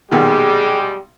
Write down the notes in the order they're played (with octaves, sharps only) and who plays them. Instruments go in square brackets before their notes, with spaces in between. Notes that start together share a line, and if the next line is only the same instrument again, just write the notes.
[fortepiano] B1 A#2 D#3 [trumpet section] G3 G#3 [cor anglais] G4 [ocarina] G#4